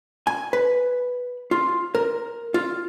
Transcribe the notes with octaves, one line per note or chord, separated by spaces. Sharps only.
G#5
B4
F4
A#4
F4